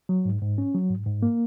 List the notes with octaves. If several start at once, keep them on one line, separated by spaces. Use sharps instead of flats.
F#3
G#2
G#2
C#4
F#3
G#2
G#2
A#3